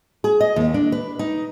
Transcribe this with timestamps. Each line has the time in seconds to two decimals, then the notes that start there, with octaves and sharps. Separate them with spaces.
0.24 G#4
0.41 D#5
0.56 D#2
0.74 D4
0.92 B4
1.19 D#4